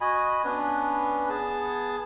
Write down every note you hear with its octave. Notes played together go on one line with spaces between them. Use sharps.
F#4 D#5 G#5 B5
B3 C#4 D4 B4
B3 G#4 A5